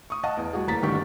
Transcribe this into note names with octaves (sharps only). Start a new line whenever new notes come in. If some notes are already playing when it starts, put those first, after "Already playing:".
C#6 D#6
D#5 F5 F#5 A5
E2
G3 F#4 G#4
F#1 E3 A#3 A#5 A6 B6
G1 D3 D#3 G4 C#6